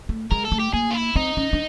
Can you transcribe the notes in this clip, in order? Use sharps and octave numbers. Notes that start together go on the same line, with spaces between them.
A3
G#3 A#4
A4
A3
G4
A#3 G#4
F4
E4
C4 D#4
C#4
D4